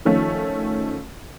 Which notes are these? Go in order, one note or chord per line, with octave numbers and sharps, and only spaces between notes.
D#3 F3 A3 C#4